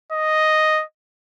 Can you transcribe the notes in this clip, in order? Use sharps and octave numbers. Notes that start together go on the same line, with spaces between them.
D#5